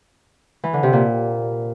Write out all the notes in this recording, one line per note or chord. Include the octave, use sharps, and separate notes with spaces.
E3
D3
C3
A#2